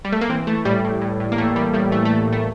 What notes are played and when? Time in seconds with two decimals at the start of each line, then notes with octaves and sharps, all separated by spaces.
0.05 G3
0.12 A3
0.21 A#3
0.30 E3 C4
0.47 E3 A3
0.65 A2 G3
0.84 A2
1.01 A2
1.20 A2
1.32 A#3
1.37 A2 A3
1.55 E3 G3
1.73 A2 G3
1.91 E3 A3
2.05 A3
2.10 E3
2.28 A2 A3